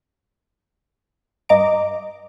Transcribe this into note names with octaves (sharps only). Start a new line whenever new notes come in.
G2 D#5 A#5 D6